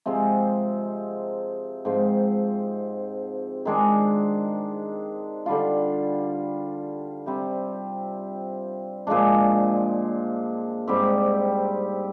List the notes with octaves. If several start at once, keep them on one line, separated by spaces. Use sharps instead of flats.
C3 F3 G#3 C4
G#2 F3 C4
D#3 G#3 D4
D3 G3 D4 F4
C3 G3 C4
A#2 F3 G#3 D4
G#2 G3 C4 G4